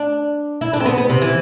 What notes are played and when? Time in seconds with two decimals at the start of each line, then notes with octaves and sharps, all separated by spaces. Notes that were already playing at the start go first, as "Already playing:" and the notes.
Already playing: D4
0.61 E4
0.73 D4
0.80 C4
0.86 B3
0.98 B3
1.09 C3
1.22 E3